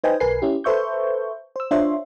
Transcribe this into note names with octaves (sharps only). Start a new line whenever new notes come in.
D#4 B4 C5 D#5 G5 G#5
B1 A#4 B4 G#5 C7
C#4 E4 G4
A4 B4 C5 E5 C#6 G6
C5 E6
D4 F4 C5 C#5 E5 C6